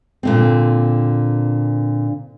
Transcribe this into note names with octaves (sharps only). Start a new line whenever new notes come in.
A#2 D3 C4